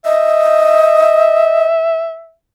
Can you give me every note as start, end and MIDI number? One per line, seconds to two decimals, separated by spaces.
0.05 1.66 75
0.05 2.33 76